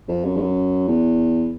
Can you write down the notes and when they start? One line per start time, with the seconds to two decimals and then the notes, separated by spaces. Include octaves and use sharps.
0.08 F2
0.24 F#2
0.36 G2
0.41 F#2
0.88 E2